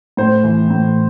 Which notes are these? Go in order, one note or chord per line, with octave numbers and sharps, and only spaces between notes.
A2 C5
E3
A2